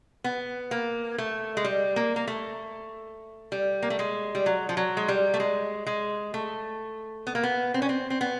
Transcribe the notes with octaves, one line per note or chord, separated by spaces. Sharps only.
B3
A#3
A3
G#3
G3
A#3
A#3
A3
G3
A#3
A3
G#3
G3
F#3
F3
F#3
G#3
G3
A3
G#3
G#3
A3
B3
A#3
B3
C4
C#4
C4
C4
B3